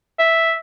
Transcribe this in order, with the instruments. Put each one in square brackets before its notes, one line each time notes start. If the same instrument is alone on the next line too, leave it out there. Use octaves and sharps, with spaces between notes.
[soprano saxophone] E5